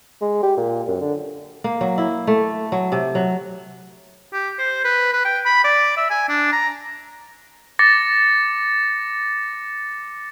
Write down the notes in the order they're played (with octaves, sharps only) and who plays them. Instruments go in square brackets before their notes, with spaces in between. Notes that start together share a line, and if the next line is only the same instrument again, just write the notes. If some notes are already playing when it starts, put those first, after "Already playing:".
[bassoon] G#3
G4
A#2
F#2
D3
[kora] A#3
F#3
E4
A3
F#3
C3
F#3
[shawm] G4
C5
B4
B4
G5
B5
D5
E5
G#5
D4
A#5
[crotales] D6 A6 A#6 C#7